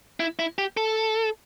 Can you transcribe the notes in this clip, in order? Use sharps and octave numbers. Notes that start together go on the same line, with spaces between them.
E4
E4
G4
A4